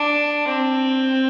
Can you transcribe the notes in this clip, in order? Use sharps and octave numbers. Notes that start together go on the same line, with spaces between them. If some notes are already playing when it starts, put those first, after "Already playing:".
Already playing: D4
C4